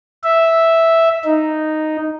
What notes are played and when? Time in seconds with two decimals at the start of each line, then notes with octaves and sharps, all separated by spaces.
0.23 E5
1.25 D#4